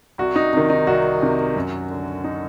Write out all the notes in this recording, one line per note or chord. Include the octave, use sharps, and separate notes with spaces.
C2 F#4
D#4
C3 D#3
D#4
C2 F#4
C3 D#3
F#2
D3
D#4